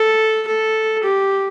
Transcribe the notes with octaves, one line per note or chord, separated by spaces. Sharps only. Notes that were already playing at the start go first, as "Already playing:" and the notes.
Already playing: A4
A4
G4